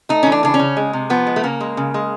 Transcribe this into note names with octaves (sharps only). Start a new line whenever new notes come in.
A3 D#4
E3 C#4
D4
C#3 D4
C#4
C#3
G#3
C3
F3 B3
G#3
A3
C#3 A#3
G#3
C#3
G#3